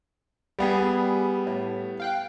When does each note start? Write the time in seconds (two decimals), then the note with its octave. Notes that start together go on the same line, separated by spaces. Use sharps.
0.59 G3 B3 G4 G#4
1.47 A2
2.00 F5 G5 F#6